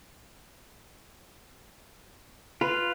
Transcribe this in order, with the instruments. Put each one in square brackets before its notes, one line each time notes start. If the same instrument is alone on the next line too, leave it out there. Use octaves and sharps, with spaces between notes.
[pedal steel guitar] F4 [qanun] B4